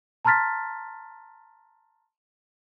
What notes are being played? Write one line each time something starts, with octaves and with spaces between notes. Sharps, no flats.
A5 A#5 C6 F6 A6 B6